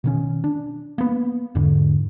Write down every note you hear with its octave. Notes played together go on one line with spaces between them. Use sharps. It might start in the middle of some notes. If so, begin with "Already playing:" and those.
B2 D#3 C#4
D4
A#3 B3
E2 G#2 D3